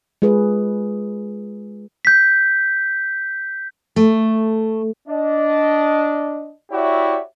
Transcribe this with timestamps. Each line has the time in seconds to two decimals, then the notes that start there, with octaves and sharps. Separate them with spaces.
0.22 G#3 F4 G#4 B4
2.05 G6 B6
3.96 A3
5.08 D4 D#5
6.71 E4 F#4 G4 C#5 D5 E5